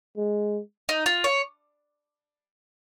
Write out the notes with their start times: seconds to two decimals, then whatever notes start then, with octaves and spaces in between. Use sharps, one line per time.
0.17 G#3
0.89 D#4
1.06 F4
1.24 C#5